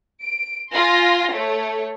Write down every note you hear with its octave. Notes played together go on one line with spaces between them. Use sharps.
D7
F4 G#5 C6 A#6
A3 C#5